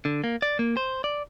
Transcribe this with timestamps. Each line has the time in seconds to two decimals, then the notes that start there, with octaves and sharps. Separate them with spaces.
0.05 D3
0.24 A#3
0.42 D5
0.59 A#3
0.77 C5
1.04 D5